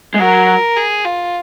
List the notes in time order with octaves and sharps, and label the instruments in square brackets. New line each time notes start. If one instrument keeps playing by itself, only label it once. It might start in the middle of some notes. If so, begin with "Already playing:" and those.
[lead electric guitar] G#3
[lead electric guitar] F#3 [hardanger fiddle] A#4
[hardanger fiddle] G#4
F4